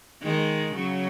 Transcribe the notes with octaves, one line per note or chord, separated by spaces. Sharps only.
D#3 G#3
C#3 F#3